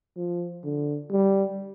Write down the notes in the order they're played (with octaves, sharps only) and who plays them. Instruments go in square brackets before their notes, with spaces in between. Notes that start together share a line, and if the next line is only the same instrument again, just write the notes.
[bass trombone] F3
D3
G3